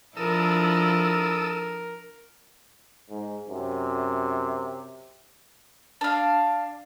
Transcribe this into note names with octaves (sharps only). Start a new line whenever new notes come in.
F3 D4 E4 A4 A#4 D#6 E6
G#2
F#2 C3
D4 F5